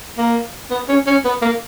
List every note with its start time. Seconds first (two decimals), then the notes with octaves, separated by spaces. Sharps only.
0.18 A#3
0.71 B3
0.89 C#4
1.07 C#4
1.25 B3
1.42 A#3